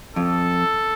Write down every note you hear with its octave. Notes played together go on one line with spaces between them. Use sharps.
F2 A4